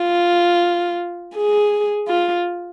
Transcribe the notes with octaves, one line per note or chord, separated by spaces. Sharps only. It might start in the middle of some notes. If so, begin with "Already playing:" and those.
Already playing: F4
G#4
F4